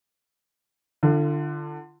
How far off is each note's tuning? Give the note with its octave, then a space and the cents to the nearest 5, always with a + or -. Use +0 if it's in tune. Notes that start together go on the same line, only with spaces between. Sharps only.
D3 +20 F4 -35